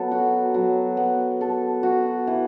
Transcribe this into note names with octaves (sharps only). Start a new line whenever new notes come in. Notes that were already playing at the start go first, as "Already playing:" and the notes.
Already playing: F#3 B3 A4
F#4
F#3
B3
A4
F#4
E3